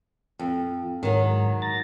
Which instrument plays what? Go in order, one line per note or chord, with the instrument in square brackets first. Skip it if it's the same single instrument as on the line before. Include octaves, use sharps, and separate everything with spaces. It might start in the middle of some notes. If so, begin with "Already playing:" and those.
[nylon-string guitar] F2
[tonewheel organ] G#2 [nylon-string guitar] D#3 F#3
[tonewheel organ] A#5 A6